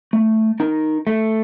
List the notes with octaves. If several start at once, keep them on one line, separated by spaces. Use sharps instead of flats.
A3
D#4 A#4
A3